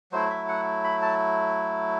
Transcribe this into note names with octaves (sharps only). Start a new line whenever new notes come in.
F#3 A3 E4 C5
E5
F#5
B5
A5